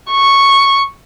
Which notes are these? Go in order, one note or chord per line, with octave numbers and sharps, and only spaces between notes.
C#6